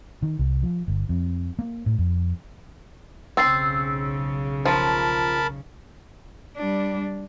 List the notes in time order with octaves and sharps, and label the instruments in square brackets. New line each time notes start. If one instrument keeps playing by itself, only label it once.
[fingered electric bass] D#3
C2
F3
G1
F2
A#3
A2
F2
[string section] B1 C#3 [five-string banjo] C4 [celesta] E6 A6 C7
[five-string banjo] F3 [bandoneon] A#4 A5 B5
[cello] G3 D4